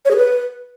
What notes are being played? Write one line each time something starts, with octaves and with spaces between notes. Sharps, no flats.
C#5
G#4
B4